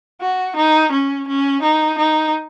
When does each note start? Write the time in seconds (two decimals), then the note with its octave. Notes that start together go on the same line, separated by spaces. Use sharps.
0.21 F#4
0.56 D#4
0.92 C#4
1.28 C#4
1.62 D#4
1.98 D#4